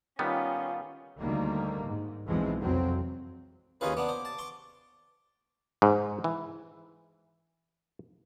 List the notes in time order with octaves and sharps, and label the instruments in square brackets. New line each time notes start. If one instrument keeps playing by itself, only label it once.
[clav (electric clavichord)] D#3 G3 B3 [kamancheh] C#4 F4
[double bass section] D2 D#3 G3 A#3
G#2
B1 E2 E3 F3 G#3 C4
C2 F2 F#3 C4
[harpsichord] D#2 D#4 B4 [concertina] C#4 F4 G#4
[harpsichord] B3 D4 [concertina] D6
[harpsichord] C5
A5
C6 C#6
[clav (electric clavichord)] G#2
E3